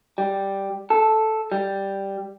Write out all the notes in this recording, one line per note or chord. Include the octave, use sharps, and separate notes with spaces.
G3
A4
G3